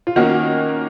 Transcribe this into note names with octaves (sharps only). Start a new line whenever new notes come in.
F4
D#3 A#3 C#4 F#4